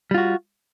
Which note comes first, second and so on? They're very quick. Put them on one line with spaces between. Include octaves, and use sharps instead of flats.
G3 F4 F#4